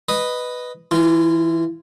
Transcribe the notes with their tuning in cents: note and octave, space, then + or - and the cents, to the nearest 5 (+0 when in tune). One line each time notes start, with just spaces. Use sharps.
B4 +5 D#5 -5
E3 +0 F4 -25